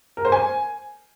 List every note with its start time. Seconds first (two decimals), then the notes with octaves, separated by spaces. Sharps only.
0.17 A#4
0.25 C5
0.32 G#5